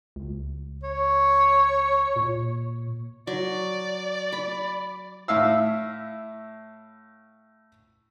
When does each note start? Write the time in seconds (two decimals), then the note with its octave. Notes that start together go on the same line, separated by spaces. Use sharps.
0.16 C#2
0.83 C#5
2.16 A#2
3.27 F#3 D5
4.32 B5
5.28 A2 E5 F5 E6